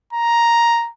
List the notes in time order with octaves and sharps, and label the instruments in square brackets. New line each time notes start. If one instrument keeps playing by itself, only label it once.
[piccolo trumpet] A#5